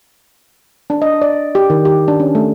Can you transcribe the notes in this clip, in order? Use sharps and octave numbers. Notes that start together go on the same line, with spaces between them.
D4
D#5
D5
G4
D#3
G4
D4
C#4
A3